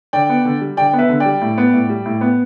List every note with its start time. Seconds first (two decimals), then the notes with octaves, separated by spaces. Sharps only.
0.13 D3 D5 G5
0.29 B3
0.45 D3
0.61 G3
0.77 D3 D5 G5
0.93 B3
0.99 B4 E5
1.09 D3
1.20 D5 G5
1.25 G3
1.41 A2
1.58 B3
1.73 A2
1.89 G3
2.06 A2
2.21 B3